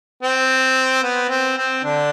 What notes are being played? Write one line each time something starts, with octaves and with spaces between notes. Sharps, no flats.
C4
B3
C4
C4
D3 D4